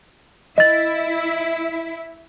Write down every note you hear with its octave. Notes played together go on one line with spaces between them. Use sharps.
E4 D#5 A6